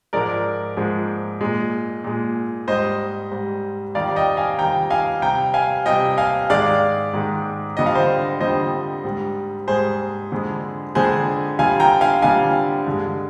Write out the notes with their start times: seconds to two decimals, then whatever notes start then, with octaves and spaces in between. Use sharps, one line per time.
0.13 G#2 F3 G#3 A#4 D5
0.77 G#2 F3 G#3
1.40 A#2 G#3
2.04 A#2 G#3
2.68 G#2 G3 C5 D#5
3.32 G#2 G3
3.95 F2 D#3 G3 D5 F5
4.16 D#5 G5
4.37 F5 G#5
4.59 F2 D#3 G3 G5 A#5
4.90 F5 G#5
5.22 C3 G3 G5 A#5
5.54 F5 G#5
5.86 C3 G3 D#5 G5
6.18 F5 G#5
6.50 G#2 D#3 G#3 D5 F5
7.13 G#2 D#3 G#3
7.77 F2 D3 G3 D#5
7.86 F5
7.95 C5 D#5
8.41 F2 D3 G3 C5 D#5
9.04 G#2 G3
9.68 G#2 G3 G#4 C5
10.32 F2 D3 G#3
10.95 F2 D3 G#3 G#4 C5
11.59 F2 D3 G3 F5 G#5
11.80 G5 A#5
12.01 F5 G#5
12.22 F2 D3 G3 F5 G#5
12.86 G2 D3 G#3